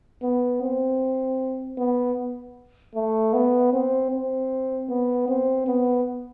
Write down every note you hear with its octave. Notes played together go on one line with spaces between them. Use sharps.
B3
C4
B3
A3
B3
C4
C4
B3
C4
B3